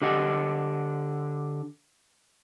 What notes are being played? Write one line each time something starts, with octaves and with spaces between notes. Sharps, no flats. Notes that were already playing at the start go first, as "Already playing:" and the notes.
D3 G4 D#5 F#5